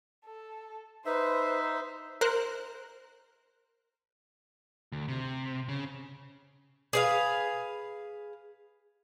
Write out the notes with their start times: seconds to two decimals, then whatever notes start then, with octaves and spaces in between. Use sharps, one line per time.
0.25 A4
1.06 D#4 B4 C5 E5
2.21 A#4 C5 F#6
4.92 D2
5.08 C3
5.68 C#3
6.93 G#4 B4 F5